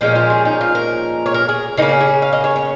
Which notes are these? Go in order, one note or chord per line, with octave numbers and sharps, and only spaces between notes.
A#2 F3 G#3 C#4 D#4
F4
G#4
D#4
F4
A#4
C#5
A#4
G#4
C#3 A#3 C#4 D#4
G#4
G#4
F5
D#5
C#5
C#5